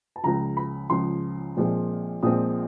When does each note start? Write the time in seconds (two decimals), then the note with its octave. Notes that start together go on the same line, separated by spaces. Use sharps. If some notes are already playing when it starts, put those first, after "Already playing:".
0.16 A5
0.23 C#2 C#3 F3 A#5
0.57 B5
0.90 C#2 C#3 F3 C6
1.57 A#1 A#2 F3 G#3 C4
2.23 A#1 A#2 F3 G#3 C4 D#6